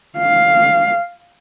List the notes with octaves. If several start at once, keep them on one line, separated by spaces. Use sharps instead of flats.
F5